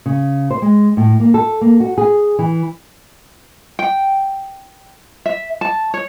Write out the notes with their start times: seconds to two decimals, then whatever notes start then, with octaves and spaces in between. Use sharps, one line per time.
0.06 C#3
0.51 C5
0.62 G#3
0.97 A2
1.20 A#3
1.34 A4
1.61 A#3
1.80 F#4
1.98 G#4
2.39 E3
3.79 G5
5.26 E5
5.61 A5
5.94 C#5